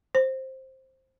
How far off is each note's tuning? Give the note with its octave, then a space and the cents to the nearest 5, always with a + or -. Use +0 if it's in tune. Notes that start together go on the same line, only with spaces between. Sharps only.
C5 +10